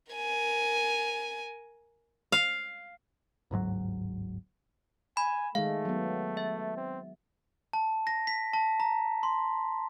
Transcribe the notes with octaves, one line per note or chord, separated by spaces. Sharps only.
A#4 G#5
F5
D1 G1 G#2 F#3
G#5 B5
D#3 G#3 A3 F5
F#3 B3
E5
C4
A5
A#6
B6
A5
A#5
C6